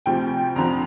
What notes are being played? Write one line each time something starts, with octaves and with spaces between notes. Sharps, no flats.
D2 C3 F3 G5
F2 D3 F3 A#5